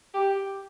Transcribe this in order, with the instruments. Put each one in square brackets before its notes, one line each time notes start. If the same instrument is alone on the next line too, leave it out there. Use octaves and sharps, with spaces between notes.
[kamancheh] G4